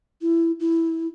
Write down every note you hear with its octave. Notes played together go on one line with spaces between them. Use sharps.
E4
E4